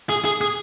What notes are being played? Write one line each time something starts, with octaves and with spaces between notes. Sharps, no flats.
G#4
G#4
G#4